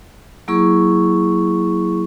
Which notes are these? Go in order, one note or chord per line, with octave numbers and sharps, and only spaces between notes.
F#3 A#3 E4 G#4 C#6